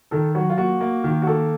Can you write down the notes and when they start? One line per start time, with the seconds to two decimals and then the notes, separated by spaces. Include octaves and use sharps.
0.11 D#3 A4
0.35 F#3 F#4
0.50 F4
0.58 A#3 F#4
0.81 A#3
1.04 D#3
1.22 F#4
1.27 A#3 A4